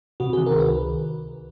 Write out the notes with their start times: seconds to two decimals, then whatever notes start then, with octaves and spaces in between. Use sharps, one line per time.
0.20 C3 F#4
0.33 D#3 G#4
0.46 A#4
0.55 C#2 B4